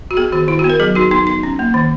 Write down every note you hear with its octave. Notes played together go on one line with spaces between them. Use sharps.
F#4
B3 G#4
D#3 F#4
D#3 E4
F#4
B3
A#4
F#3 G#4
D#4 F#4
B3 D#4
D#4
C#4
A#3
D#3